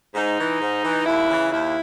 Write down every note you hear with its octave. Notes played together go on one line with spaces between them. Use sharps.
G#2 D#4
E3
G#2
E3
D#2 E4
C#3 E3
D#2 E4